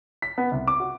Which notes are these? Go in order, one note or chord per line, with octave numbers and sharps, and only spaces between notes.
B6
B3
C2
D6
F#4